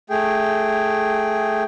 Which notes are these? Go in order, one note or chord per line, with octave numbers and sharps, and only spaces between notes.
A3 G#4 G5